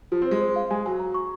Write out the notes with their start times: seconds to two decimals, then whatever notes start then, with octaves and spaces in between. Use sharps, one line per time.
0.12 F3 F4
0.22 C4
0.26 C5
0.31 G#3
0.41 C5
0.56 F5
0.70 G#3 G#5
0.86 F#3 G#5
1.00 A#5
1.14 C#6